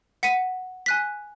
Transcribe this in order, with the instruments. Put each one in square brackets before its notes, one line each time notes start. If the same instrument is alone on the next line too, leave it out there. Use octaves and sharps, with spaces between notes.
[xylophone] F#5 B6 C#7 D#7
G#5 F#6 B6